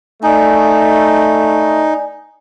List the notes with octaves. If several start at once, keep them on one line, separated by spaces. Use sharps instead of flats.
A3 D#4 D5 G#5